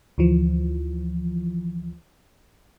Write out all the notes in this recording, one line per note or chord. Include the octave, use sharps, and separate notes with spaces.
D2 E3 F3